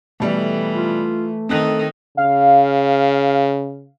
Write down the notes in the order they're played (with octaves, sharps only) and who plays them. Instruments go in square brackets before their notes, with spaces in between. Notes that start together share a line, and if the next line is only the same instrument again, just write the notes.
[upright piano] B2 G3 [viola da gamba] E3 [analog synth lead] A3
[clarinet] F4
[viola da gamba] D#3 D#4 [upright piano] C4 F#6 [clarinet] A4
[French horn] C#3 [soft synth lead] F5